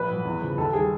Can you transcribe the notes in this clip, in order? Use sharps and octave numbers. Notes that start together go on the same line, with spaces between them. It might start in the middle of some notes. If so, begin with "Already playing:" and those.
Already playing: A#1 B4
A#2 F#3
E2
C#3 F3
D#2 A4
D#3 G3 G#4